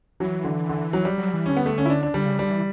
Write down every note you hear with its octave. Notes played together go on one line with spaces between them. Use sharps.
E3 F#3
D3
D3
F#3
G3
F#3
E3
D3 C#4
B3
A3
C#4
E4
D4
D4
D3 G3
C#3
D3 G3
E3